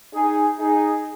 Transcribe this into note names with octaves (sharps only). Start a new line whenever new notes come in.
D#4 G#4
D#4 G#4